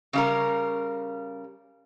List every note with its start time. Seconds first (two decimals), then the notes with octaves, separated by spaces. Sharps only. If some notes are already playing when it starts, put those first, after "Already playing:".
0.13 C#3 G3 A#4